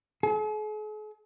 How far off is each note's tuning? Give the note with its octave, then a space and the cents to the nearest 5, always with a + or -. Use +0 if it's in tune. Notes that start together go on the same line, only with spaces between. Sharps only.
G#4 +45